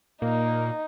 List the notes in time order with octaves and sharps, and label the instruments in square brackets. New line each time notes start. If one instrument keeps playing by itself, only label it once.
[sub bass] A#2 [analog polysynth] A#3 [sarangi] D#4